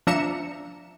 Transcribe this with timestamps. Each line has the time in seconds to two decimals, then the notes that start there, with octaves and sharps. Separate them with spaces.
0.07 F3 D4 E5 A#5 C#7 E7